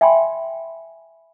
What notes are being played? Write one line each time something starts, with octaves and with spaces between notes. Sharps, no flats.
E5 G5 G#5 B5 C6